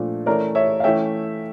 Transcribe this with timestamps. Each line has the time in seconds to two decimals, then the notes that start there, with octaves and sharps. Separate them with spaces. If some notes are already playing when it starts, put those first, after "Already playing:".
Already playing: A#2 F3 A3 D4
0.26 E3 A3 C#4 A#4 D5
0.55 C#5 E5
0.80 F5
0.84 E3 A3 C#4 E5 G5